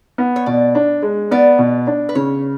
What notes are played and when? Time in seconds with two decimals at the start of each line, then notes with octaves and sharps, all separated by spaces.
0.18 B3
0.36 C#5
0.46 B2 D5
0.75 D4
1.02 G#3
1.31 B3 D5
1.59 B2
1.87 D4
2.09 B4
2.15 C#3 C#5